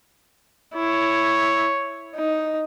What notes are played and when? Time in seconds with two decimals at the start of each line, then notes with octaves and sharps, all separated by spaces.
0.74 E4 C#5
2.15 D#4